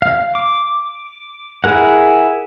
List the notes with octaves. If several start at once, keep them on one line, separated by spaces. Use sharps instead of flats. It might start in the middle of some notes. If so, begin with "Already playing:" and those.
F5
D6
E4 G#4 A#4 F#5